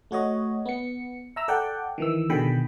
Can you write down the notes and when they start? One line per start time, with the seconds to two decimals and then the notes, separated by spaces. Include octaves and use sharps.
0.11 A3 F#4 C#5 D#5
0.66 B3 C#7
1.36 E5 A#5 E6
1.48 A4 D5 F#5 G5
1.98 D#3 E3 E6
2.30 B2 D3 D#3 G#4 G5 B5